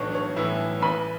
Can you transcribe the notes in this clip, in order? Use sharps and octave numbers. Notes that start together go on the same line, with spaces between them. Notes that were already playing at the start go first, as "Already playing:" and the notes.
Already playing: B1 A2 E3 D4 C#5
C#5
A2 E3 E4 E5
A1 B4 B5